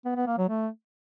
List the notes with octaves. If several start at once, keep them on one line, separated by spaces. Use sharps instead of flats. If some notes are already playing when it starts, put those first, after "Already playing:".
B3
B3
A#3
F#3
A3